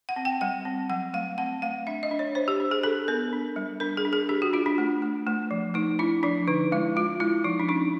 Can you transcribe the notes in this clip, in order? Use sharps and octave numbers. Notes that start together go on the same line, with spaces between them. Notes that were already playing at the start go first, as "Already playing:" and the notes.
F#5
C4
G5
G3 F#5
C4
F#3 F#5
A3 F5
C4 F#5
A3 F5
D4 E5
D#5
D4
C#5
D4 C5
G4
D4
G#4
D4 A4
B3 A#4
D4
G3
D4 A#4
G#4
D4
G#4
D4 G4
F#4
D4 F4
D4
A3
A3
A3
F3
A3 D#4
D4 E4
F3 D4
D3 D#4
G#3 E4
G#3 F4
G#3 E4
F3 D#4
D4
C#4 D#4